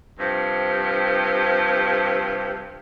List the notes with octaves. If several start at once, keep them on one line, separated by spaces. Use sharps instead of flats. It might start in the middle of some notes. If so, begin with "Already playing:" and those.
G2 C3 F3